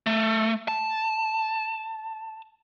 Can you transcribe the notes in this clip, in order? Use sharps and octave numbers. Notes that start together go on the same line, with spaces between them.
A3
A5